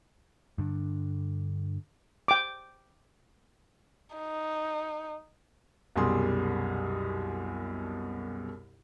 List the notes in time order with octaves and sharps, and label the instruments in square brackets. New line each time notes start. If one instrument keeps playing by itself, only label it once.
[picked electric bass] G2 D3
[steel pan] G5 D6
[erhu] D#4
[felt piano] C2 F#2 B2 G3 G#4 C6